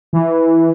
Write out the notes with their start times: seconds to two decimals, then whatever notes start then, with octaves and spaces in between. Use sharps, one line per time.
0.13 E3